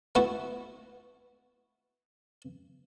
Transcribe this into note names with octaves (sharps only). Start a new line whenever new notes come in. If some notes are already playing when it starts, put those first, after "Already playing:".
A3 B3 E4 F#4 A4